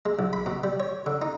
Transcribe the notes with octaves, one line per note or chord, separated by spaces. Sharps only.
G#3
B1
B5
B2
G3
C#5
D3
D#4